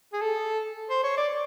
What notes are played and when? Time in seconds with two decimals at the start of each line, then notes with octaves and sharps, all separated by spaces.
0.13 G#4
0.22 A4
0.90 C5
1.04 C#5
1.17 D5